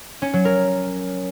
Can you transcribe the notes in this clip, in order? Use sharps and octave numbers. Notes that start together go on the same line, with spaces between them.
C#4
F#3
A#4